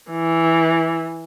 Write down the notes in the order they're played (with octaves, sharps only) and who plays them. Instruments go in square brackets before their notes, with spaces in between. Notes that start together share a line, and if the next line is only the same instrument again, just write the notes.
[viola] E3